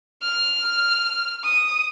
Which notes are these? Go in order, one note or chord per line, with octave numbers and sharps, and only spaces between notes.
F6
D#6